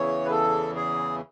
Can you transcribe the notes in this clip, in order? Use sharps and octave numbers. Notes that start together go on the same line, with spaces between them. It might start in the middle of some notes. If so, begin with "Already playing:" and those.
Already playing: E2 C#3 E3 C#5
B4
A4
G#4